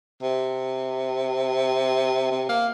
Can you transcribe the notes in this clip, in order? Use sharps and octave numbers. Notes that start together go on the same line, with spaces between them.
C3
C3
A#3